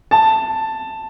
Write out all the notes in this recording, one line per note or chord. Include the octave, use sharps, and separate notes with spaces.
A5